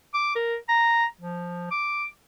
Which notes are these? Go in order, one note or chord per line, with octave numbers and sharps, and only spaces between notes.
D6
A#4
A#5
F3
D6